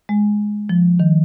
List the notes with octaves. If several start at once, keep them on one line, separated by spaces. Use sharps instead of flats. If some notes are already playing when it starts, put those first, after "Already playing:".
G#3
F3
D#3